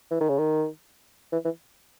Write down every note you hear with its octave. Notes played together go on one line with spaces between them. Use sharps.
E3
D#3
C#3
D#3
E3
E3